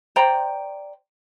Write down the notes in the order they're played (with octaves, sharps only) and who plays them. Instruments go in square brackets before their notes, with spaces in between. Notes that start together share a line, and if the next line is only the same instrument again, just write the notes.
[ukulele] C5 D5 G5 A#5